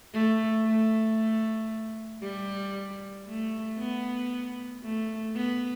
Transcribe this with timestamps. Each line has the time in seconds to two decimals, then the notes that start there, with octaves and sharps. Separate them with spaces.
0.13 A3
0.66 A3
2.23 G3
3.27 A3
3.79 B3
4.84 A3
5.36 B3